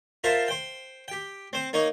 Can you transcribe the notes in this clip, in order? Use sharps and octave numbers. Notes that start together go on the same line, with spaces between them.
F4 A#4 C5 E5 F5 A5
C5 G5
G4 G5
C4 C5
A#3 D#4 C#5